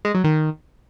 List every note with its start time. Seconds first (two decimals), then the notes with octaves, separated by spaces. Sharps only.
0.05 G#3
0.14 F#3
0.24 D#3